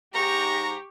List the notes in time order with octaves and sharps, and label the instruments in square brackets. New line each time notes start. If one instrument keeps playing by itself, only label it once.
[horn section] G#2 D#4 A#5 [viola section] G4 [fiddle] C#6